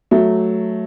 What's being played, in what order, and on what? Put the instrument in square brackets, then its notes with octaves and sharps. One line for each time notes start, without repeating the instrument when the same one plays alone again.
[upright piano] F#3 A3